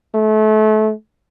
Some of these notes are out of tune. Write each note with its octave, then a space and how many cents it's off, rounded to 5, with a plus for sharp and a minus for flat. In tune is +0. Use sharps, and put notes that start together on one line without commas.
A3 -30